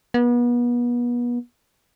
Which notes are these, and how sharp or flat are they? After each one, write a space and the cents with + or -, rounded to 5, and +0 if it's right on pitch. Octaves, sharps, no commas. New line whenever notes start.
B3 -35